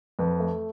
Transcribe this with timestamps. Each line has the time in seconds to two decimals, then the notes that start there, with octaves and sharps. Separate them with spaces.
0.19 F2 B4
0.40 A3